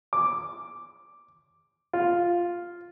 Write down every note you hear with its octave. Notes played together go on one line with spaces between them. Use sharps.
D6
F4